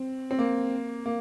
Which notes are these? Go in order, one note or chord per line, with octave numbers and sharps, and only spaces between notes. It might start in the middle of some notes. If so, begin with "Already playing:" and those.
Already playing: C4
C4
A#3
A#3